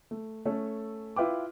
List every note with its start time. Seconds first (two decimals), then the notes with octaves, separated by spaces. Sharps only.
0.11 A3
0.45 A3 C#4 A4
1.16 E4 F4 B4 G5 D6